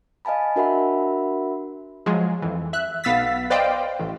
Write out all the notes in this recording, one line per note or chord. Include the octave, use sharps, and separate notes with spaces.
D#5 F5 G#5 A5 B5
D4 F#4 A#4 E5 F#5 B5
F3 F#3 G#3
F2 E3
E5 F#6
B1 B3 F5 E6 A6 B6
B4 C5 D5 D#5 F5 G5
A1